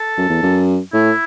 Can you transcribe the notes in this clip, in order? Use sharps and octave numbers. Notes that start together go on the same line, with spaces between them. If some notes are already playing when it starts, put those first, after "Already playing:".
Already playing: A4
F#2
E2
F#2
A2 E4